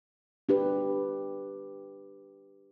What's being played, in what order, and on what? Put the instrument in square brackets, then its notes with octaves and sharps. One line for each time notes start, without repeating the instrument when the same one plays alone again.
[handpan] D4 G4 B4